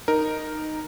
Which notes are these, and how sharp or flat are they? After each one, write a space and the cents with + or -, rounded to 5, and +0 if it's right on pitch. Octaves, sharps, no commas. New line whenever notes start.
D#4 -5 A#4 +0